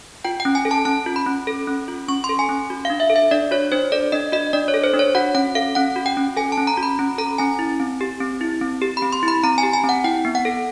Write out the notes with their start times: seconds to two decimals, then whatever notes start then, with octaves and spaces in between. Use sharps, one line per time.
0.25 F4 G5
0.40 G5
0.45 C#4
0.55 G#5
0.65 A4
0.71 A5
0.85 C#4 A5
1.06 F4
1.16 B5
1.26 C#4
1.47 A4
1.67 C#4
1.88 F4
2.08 C#4 C#6
2.24 C6
2.29 A4
2.39 G#5
2.49 C#4
2.70 F#4
2.85 D4 F5
3.00 E5
3.10 A4
3.16 E5
3.31 D4 D5
3.51 F#4 C#5
3.72 D4 C5
3.92 A4 D5
4.12 D4 D#5
4.32 F#4 D#5
4.53 D4 D5
4.68 C#5
4.74 A4
4.84 C5
4.94 D4
4.99 C#5
5.15 F#4 F#5
5.35 C#4 F#5
5.55 A4 F5
5.75 C#4 F#5
5.96 F#4
6.06 G5
6.17 C#4
6.37 A4 G#5
6.52 A5
6.58 C#4
6.67 A#5
6.77 F#4
6.83 B5
6.99 C#4
7.18 A4 A#5
7.38 C#4 G#5
7.59 E4
7.80 C4
8.01 G4
8.20 C4
8.41 E4
8.61 C4
8.82 G4
8.97 B5
9.02 C4
9.12 C6
9.23 E4
9.28 B5
9.44 C4 A#5
9.58 G#5
9.63 G4
9.73 G#5
9.84 C4
9.89 F#5
10.04 E4 G5
10.25 B3
10.35 F#5
10.45 A4